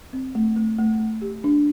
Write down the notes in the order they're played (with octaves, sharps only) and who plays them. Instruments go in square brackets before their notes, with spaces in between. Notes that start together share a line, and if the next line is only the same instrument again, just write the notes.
[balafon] C4
A3
A3
A3
A3
G4
D4